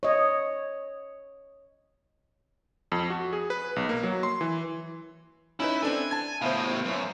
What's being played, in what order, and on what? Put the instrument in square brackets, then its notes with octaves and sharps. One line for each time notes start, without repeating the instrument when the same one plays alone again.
[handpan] C#5 D#5
[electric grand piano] F2
F#4
G#4
B4
B1
A#3
F#3
C6
E3
[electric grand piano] C#4 D#4 B4 [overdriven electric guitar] E4
[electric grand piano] C4 D4 A4 [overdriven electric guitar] G#5
[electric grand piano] A5 G#6
[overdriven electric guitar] A2 B3 [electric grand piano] C5 E5 F5
[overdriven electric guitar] F#2